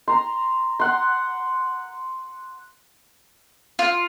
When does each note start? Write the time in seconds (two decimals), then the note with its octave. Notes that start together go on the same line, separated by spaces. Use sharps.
0.08 A#5 C6
0.80 F#5 C6
3.79 F4